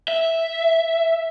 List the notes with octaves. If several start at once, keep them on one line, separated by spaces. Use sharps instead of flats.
E5